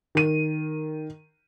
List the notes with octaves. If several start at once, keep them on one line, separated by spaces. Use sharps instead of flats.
D#3 D#7